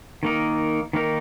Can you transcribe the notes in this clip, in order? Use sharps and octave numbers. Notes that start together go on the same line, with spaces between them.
D#3 A#3 D#4 A#4
D#3 A#3 D#4 A#4